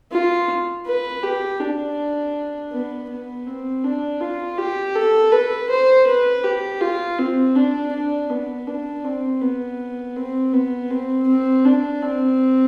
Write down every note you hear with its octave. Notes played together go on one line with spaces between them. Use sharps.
F4
B4
G4
D4
B3
B3
C4
D4
F4
G4
A4
B4
C5
B4
G4
F4
C4
D4
D4
B3
D4
C4
B3
C4
B3
C4
C4
D4
C4